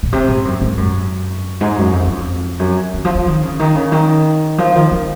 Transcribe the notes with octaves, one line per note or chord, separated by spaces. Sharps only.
A#2
C3
G#2
F#2
G#2
F#2
G#2
F#2
F2
F#2
F2
F#2
D#3
F3
F3
D#3
C#3
D#3
C#3
D#3
F3
D#3
D#3